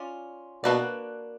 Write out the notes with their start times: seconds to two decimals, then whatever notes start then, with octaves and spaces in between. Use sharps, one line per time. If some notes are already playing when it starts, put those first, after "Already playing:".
Already playing: C#4 F4 D5
0.64 B2 A#3 D4 F#4 B4 D5